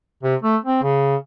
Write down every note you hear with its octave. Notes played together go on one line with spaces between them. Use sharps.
C3
A3
C4
C#3